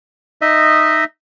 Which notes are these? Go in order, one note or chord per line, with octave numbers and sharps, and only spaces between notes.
D#4 D#5 E5